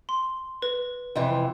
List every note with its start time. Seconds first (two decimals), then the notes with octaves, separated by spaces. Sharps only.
0.09 C6
0.62 B4
1.15 F2 C3 E3